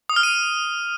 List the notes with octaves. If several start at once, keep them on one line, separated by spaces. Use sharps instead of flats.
D#6
F6
D#7